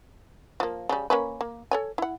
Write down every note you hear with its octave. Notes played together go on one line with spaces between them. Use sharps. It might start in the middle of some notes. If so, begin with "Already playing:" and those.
F3 A#3
C#3 G3
A#3 C#4 B4
A#3
A4 C#5 G#5
E4 F#5